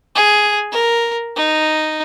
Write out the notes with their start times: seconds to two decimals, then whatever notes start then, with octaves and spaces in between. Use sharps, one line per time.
0.15 G#4
0.72 A#4
1.36 D#4